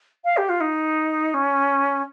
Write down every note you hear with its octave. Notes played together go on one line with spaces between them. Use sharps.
F5
G4
F4
D#4
C#4